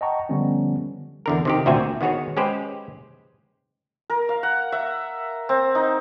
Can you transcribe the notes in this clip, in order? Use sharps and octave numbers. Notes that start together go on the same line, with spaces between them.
D#5 F#5 G5 A5 A#5 C#6
D3 F3 G3 B3 C#4
E2 D3 A#4
C3 D#3 G4
D2 A#2 C4 F#4 E5 G#5
D#3 B3 F#4 G#4 C#5
G#3 C#4 G4 B4 C5
A#4
F5
F#5
E5
C4
D#4